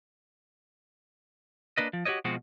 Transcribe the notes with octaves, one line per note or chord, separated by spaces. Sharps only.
A#3 D4 B4 D#5
F3
F#4 G4 C5 C#5 D#5
B2 F3 G#3 C4 F#4